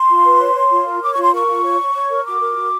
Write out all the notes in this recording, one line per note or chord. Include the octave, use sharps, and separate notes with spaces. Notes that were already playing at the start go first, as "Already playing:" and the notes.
Already playing: C6
F4
B4
C#5
C#5
F4
A#4
C#5 D6
F4 C#6
C6
A#4 C#6
F4
C#5
C#5
C#5
A#4
F#4 D6
A#4
F#4